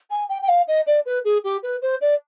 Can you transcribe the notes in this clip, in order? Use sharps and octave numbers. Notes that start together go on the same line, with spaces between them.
G#5
G5
G5
F5
D#5
D5
B4
G#4
G4
B4
C5
D5